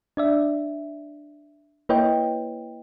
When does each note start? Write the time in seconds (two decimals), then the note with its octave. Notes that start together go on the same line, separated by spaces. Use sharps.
0.17 D4 D5 E5
1.89 A#3 E4 B4 C#5 D#5 G5